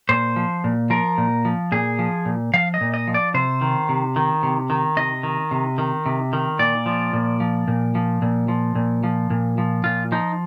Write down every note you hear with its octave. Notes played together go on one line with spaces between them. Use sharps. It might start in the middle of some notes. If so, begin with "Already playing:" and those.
A#2 C5
F3
A#2
F3 A#4
A#2
F3
A#2 G#4
F3
A#2
F3 F5
D#5
A#2
D#5
F3
D5
C3 C5
D#3
C3
D#3
C3
D#3
C3 D#5
D#3
C3
D#3
C3
D#3
A#2 D5
F3
A#2
F3
A#2
F3
A#2
F3
A#2
F3
A#2
F3
A#2 F4
F3 D#4